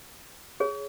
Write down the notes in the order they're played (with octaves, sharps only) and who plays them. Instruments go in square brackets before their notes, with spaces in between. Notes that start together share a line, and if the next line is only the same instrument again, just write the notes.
[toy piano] G#4 C#5